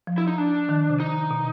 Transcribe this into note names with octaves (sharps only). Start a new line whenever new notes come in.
F3
E4
D#4
D4
D#3
C3
D#4
B2